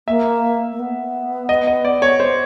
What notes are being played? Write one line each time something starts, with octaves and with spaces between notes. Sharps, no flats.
A#3 E5
A#3
B3
D#5
D#5
D5
C#5
C5